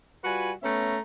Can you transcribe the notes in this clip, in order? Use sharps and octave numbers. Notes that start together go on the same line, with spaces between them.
G3 F4 F#4 B4 G#5
A3 B3 C#4 E5 A#5